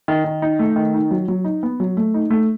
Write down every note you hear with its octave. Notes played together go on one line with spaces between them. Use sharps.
D#3
D#3
D#4
A3
D#3
D#4
F#3
F#3
D#4
B3
F#3
A3
D#4
A3